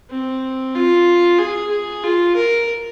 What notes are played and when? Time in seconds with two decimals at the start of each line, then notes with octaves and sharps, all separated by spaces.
0.10 C4
0.75 F4
1.39 G#4
1.71 G#4
2.04 F4
2.36 A#4